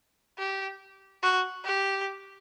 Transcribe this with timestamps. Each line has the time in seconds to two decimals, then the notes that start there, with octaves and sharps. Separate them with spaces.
0.38 G4
1.23 F#4
1.65 G4